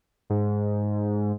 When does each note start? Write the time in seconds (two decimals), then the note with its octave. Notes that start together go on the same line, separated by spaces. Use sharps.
0.30 G#2